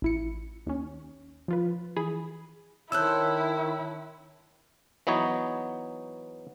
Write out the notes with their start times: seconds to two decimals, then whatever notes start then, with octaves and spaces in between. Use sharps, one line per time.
0.02 A1 E4 C#7
0.66 D#2 C#4
1.48 F3 F4 B4
1.96 E3 G#4 B5
2.92 D#3 C#4 E4 A4 C5 E6 F#6
5.07 E3 F#3 B3 D#4 C#5